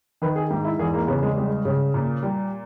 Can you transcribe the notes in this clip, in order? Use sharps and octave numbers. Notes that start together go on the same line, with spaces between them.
D#3 B4
G#4
G#2 G4
E4
E2 G#4
A#3
C#3 B3
G#3
G3 G#3
C#3
A#2
G3